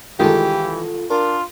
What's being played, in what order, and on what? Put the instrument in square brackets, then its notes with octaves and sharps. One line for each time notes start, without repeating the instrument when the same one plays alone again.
[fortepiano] C2 D#3 G#3 [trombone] E3 [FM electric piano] F4 A4 [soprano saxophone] G4
[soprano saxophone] D4 [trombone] F4 [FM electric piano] A#4